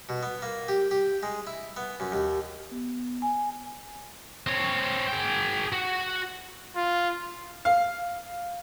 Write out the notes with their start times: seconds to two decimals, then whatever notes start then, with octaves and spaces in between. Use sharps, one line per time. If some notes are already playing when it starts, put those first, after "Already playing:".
0.09 B2
0.23 B3
0.42 A#3
0.68 G4
0.91 G4
1.23 G#3
1.47 E4
1.77 B3
2.00 F#2
2.12 D#2
2.71 B3
3.22 G#5
4.47 C4 C#5
5.09 G#4 G5
5.73 F#4
6.75 F4
7.65 F5